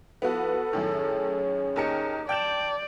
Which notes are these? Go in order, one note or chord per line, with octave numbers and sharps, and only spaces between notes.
F3 B3 E4 F#4 A4 B4
F#2 A2 D#3 C#4 G#4 C#5
D#2 D#4 A#4 C#7
D5 G5 A5 G6 E7